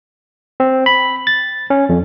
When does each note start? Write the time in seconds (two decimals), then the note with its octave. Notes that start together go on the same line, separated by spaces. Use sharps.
0.60 C4
0.86 B5
1.27 A6
1.70 C#4
1.89 F2